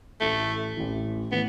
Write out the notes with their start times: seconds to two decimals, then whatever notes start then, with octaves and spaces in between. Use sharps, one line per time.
0.21 A1 A2 E3 A3
0.77 A1 A2 E3
1.32 A2 E3 B3